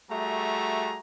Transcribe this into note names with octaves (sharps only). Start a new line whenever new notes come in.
G3 A3 F#4 G#4 E5 A#5